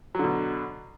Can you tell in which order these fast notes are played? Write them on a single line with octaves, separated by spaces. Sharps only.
F#3 D3 B2